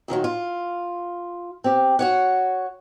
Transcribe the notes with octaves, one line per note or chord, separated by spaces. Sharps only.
A#2 D#3 F3 F#3
F4
C4 G4
F#4 C#5 F#5